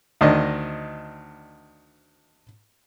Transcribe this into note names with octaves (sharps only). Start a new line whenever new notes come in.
D2 D#3 D4 D#5